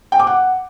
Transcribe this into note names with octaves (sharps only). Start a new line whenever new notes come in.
G5
D6
F#5